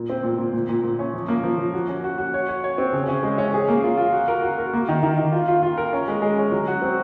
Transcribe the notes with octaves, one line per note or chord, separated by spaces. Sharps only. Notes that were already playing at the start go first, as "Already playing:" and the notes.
Already playing: A#2
C4
A#2
A#2
A#2
A#2
A#2
C#4
F3
A#3
F3
F3
F#4
C#4
F#4
F#4
C#5
C#5
C#5
C4
C#3
C#4
G#3
C#4
G#4
A#3
F4
F4
F#4
A#4
F#4
A#4
A#3
D#3
D#3
D#3
F4
F4
F4
A#4
C#4
G#3
G#3
C#4
F#3
F#4
C4